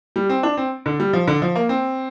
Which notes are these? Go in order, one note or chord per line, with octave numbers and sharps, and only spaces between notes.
G3
C4
D4
C4
D3
G3
F3
D3
F3
A#3
C4